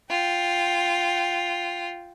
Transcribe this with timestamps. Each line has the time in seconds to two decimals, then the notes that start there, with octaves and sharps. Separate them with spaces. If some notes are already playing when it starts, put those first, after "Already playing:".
0.10 F4 G5